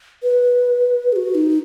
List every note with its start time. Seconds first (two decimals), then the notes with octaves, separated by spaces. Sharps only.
0.23 B4
1.12 G#4
1.16 F#4
1.35 D#4